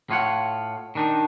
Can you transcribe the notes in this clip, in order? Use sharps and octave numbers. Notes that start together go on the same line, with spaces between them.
A2 F4 C#5 F#5
D#3 D4 D#4